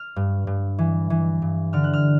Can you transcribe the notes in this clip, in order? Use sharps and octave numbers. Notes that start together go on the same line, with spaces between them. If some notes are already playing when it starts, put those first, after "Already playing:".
Already playing: F6
G2
G2
E3
E3
G2
D3 F6
F#6
F6